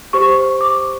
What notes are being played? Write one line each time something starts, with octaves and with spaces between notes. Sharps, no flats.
G4 C5 C#6
D6